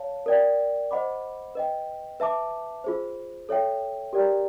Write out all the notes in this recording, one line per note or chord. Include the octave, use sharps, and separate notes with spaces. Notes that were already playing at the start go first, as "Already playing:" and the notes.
Already playing: C#5 F5 A5
A#4 D5 G5
C5 D#5 F#5 B5 D6
B4 D#5 G5
B4 E5 A5 D6
F4 G#4 C5
A4 C#5 E5 G5
G4 A#4 D5 G5 A#5